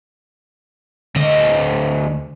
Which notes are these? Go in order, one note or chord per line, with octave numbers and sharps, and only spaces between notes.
D2 D3 D#5